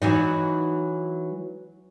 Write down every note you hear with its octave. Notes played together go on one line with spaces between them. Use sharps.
E3 F#3 D#4